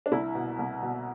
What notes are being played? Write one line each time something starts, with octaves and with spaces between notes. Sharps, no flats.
D4
C2 E4
B2
C2
B2